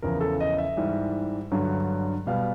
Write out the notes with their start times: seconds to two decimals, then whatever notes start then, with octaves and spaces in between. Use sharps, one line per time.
0.02 E2 C#3 F3 A#4
0.21 A4
0.40 D#5
0.58 E5
0.77 G#2 E3 G3
1.52 G2 D3 F#3
2.27 B2 G3 B3 F5